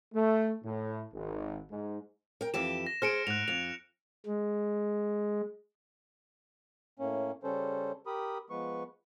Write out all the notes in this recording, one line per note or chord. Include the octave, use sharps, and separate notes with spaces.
A3
A2
G#1
G#2
A#4 G5
F2 E3 G4 E7
A#6
G#4 C5 F6 C#7 D7
G#2 F#6 F7
F2 F7
G#3
A2 A#3 C#4
C#3 G3 C#4 A4 C5
G4 A#4 B5 D#6
F3 G#3 B3 B4 C#6